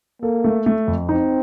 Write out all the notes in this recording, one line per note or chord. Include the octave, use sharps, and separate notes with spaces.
A#3 A4
A3
A3
F2
C4 D#4